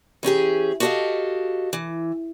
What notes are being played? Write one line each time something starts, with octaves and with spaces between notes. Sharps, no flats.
E3 C#4 G4 G#4
F#4 G4 A4 C5 D#5 F5
E3